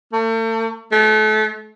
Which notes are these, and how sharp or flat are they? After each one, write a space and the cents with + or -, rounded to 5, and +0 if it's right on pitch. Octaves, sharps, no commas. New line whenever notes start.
A3 +40
A3 -30